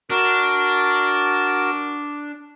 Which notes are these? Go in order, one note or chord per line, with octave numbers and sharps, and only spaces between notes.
D4 F#4 A#4